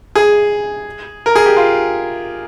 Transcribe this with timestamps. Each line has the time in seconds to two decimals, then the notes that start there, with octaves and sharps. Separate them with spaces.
0.16 G#4
1.26 A#4
1.36 G#4
1.46 G4
1.57 F4